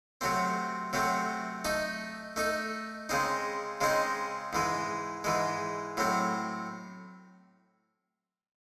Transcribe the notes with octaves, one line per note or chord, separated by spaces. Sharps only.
C3 F#3 A3 C4
C3 F#3 A3 C4
A3 D#4 A4
A3 D#4 A4
C#3 G#3 C4 D#4
C#3 G#3 C4 D#4
G#2 E3 G#3
G#2 E3 G#3
A2 F#3 C4